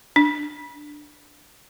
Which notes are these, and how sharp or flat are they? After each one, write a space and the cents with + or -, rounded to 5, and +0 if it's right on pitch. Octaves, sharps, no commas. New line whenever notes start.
D4 +10